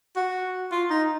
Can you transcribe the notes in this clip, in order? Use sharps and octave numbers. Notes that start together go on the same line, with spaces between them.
F#4
F4
D#4